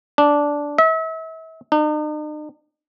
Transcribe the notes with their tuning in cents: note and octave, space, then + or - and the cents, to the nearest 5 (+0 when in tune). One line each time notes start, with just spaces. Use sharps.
D4 -10
E5 -35
D#4 -45